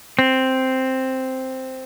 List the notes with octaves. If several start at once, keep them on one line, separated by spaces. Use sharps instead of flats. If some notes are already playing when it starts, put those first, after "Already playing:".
C4